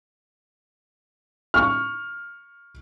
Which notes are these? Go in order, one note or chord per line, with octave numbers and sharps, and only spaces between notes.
C#6 F6